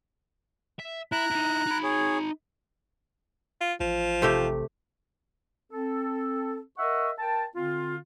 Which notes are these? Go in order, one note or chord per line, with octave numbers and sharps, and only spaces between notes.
E5
E4 A#5 F#6
D#4 E4
D#4 B5
G#4 C#5
F4
A1 F3
C3 A3 G4
C4 A4
A#4 D#5 E5 F#5 C#6
A#4 G5 A5
D3 C4 F4